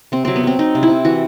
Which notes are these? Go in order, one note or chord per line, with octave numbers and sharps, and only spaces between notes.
C3 C4
F#3 C4
B3
F#3 C4
F#3 D#4
C3
E4
C3
E3 F#4